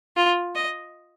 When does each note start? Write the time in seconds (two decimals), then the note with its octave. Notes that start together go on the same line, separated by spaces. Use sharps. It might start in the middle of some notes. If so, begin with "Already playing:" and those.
0.17 F4
0.55 D#5